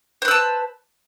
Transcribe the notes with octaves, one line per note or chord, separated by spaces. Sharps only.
B4 C5 A5 E6